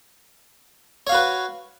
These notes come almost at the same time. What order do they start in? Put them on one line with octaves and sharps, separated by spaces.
C#5 F5 F#4 B4